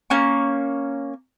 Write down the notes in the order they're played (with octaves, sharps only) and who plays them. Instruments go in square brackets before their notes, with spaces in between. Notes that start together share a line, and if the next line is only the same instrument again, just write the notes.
[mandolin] A#3 C#4 C#6